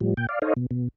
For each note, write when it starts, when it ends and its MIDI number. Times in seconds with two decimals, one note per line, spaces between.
0.01 0.14 45
0.01 0.14 53
0.01 0.14 55
0.17 0.27 46
0.17 0.27 79
0.29 0.39 74
0.29 0.39 77
0.42 0.54 63
0.42 0.54 69
0.42 0.54 72
0.42 0.54 73
0.42 0.54 75
0.42 0.54 77
0.56 0.66 47
0.71 0.88 47